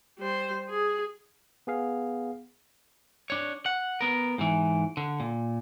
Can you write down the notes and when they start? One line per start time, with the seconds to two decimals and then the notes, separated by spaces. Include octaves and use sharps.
0.19 G3 C5
0.70 G#4
1.67 B3 G#4 F5
3.30 D4 C#5
3.66 F#5
4.01 B3 A#4
4.38 G#2 E3
4.97 D3
5.20 A#2